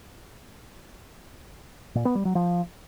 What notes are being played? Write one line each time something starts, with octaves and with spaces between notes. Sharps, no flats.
A#2
B3
G3
F#3
F3